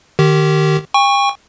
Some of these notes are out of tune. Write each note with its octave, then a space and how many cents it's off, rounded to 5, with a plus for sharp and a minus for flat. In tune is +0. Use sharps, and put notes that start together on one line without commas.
D#3 -25 G4 -20
G5 +45 C#6 +0